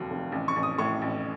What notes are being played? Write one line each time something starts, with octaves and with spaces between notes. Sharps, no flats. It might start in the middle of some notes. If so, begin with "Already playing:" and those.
Already playing: F1 D#2 F#3
F1
A1
C#6
A1
D#6
A2 C#6
A1